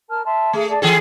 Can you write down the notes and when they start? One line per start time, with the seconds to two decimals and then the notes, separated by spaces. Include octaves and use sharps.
0.09 A#4 A5 F6
0.24 E5 A5 C6
0.53 A3 G#4
0.68 G#4 D5 A5
0.82 E3 G#4 A4 G#5